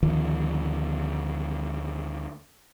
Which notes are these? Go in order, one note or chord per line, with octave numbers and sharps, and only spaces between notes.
D2 D#3 F3